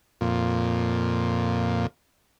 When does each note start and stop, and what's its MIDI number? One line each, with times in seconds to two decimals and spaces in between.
0.21 1.87 41
0.21 1.87 46